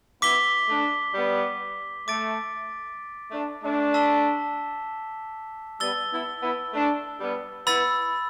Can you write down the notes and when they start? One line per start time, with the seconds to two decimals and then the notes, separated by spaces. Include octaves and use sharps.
0.21 B3 E4 D6 B6 G7
0.68 A3 D4
1.14 G3 B3
2.07 A3 D6 A6 D7
3.31 A3 D4
3.62 A3 D4
3.94 A5 E6 B6 E7 G7
5.80 G3 B3 E6 A6 G7
6.12 B3 E4
6.42 B3 E4
6.73 A3 D4
7.20 G3 B3
7.66 B3 E4 B5 E6 A6